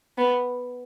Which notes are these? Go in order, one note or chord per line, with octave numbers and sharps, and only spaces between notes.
B3